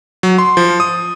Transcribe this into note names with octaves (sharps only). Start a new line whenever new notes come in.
F#3
C6
F3
D#6